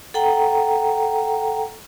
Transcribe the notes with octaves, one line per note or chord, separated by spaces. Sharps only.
A4 F#5 G5 A#5